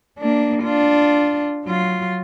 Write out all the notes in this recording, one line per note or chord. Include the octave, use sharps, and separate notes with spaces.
A#3 D4
D4 F4
F#3 F4